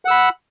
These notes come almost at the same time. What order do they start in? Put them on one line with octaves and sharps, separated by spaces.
F#5 E6 B5